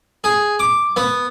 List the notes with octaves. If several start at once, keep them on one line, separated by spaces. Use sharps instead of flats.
G#4
D6
B3